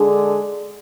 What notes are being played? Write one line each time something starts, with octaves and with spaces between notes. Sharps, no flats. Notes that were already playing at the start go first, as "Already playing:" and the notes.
Already playing: D3 G#3 D4 G#4